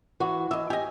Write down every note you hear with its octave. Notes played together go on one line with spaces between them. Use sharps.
E3 F#4
E3 D#5 E5
G4 D#5 G#5